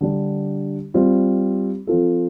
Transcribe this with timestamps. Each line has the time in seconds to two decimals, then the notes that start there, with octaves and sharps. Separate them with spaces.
0.01 D3 G3 D4
0.94 G3 C4 F4
1.87 F3 C4 F4 A4